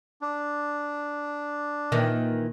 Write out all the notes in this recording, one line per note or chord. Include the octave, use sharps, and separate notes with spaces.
D4
A#2 D#3 E3